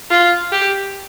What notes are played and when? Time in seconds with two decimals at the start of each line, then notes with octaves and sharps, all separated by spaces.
0.11 F4
0.52 G4